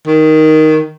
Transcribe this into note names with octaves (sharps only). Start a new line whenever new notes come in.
D#3